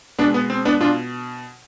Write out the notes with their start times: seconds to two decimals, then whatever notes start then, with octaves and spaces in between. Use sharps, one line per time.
0.18 B2 G#3 B3 D4
0.34 B3
0.50 C4
0.65 B3 D4
0.80 B2 D4 F4